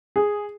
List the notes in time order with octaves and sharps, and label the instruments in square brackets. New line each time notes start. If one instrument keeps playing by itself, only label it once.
[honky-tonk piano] G#4